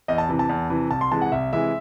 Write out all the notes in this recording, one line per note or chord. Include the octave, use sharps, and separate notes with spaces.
E2 D#5
A5
C3 E3
A5
E2
C3 E3
C2 A5
C6
C3 E3 G#3 A5
F#5
C2 E5
C3 E3 G#3 E5